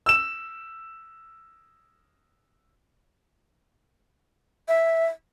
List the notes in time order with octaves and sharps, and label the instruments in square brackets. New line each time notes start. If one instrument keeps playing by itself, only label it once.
[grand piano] E6 E7
[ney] E5